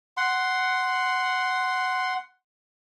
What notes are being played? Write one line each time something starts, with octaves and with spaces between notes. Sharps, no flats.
F#5 C6